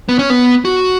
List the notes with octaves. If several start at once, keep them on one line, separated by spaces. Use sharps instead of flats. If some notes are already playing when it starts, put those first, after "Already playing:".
B3
C#4
B3
F#4